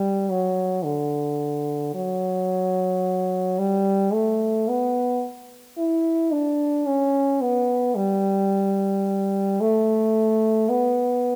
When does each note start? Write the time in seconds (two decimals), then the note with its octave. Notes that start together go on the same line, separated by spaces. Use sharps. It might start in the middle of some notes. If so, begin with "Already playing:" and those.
Already playing: G3
0.30 F#3
0.84 D3
1.94 F#3
3.59 G3
4.13 A3
4.68 B3
5.77 E4
6.32 D4
6.86 C#4
7.41 B3
7.95 G3
9.60 A3
10.69 B3